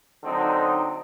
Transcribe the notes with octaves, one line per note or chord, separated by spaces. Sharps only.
D3 F#3 C4 D#4